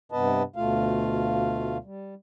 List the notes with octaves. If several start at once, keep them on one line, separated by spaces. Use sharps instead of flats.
G2 C3 B3 B4 D#5 A5
D2 B2 A3 F4 F5
G3